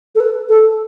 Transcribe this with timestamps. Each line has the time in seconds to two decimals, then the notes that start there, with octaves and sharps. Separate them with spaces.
0.15 A4
0.20 B4
0.49 A4